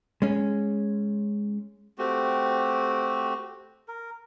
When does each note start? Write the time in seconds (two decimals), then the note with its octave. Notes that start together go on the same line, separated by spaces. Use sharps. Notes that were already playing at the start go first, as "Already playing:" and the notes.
0.22 G#3 C#4
1.98 A3 C4 F#4 G4
3.88 A#4